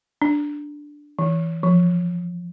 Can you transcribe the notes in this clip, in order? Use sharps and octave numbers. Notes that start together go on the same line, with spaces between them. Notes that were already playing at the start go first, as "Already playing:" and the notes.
D4
E3
F3